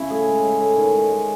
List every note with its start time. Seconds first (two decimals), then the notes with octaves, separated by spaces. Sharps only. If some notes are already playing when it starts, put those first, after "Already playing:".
Already playing: C#3 C#4 E4
0.10 A2 G#4
0.27 G#3
0.44 G#3
0.61 A2
0.77 D#3
0.94 G#3
1.11 G#3